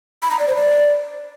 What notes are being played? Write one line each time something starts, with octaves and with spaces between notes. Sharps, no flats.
B5
A#5
D5
C5
D5